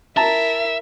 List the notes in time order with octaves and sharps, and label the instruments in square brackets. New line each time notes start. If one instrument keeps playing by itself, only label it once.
[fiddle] E4 A#4 [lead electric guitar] E5 [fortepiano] A5 A#5